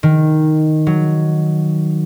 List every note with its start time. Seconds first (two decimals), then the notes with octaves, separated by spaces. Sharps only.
0.03 D#3
0.87 F#3